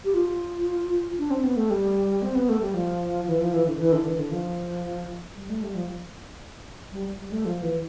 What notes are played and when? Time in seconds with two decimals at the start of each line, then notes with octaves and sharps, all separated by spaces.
0.05 G4
0.14 F4
1.19 D4
1.31 C4
1.44 B3
1.57 A3
1.70 G3
2.22 C4
2.35 B3
2.49 A3
2.61 G3
2.74 F3
3.27 E3
3.40 F3
3.53 E3
3.67 D3
3.79 E3
3.93 D3
4.06 E3
4.19 D3
4.32 F3
5.36 G3
5.49 A3
5.63 G3
5.75 F3
6.92 G3
7.19 G3
7.32 A3
7.45 F3
7.62 E3